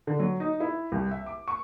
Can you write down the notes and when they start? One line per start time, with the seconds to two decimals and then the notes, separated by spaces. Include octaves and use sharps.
0.07 D3
0.20 F#3
0.40 D#4
0.60 E4
0.92 C2
1.11 E5
1.26 D6
1.48 C#6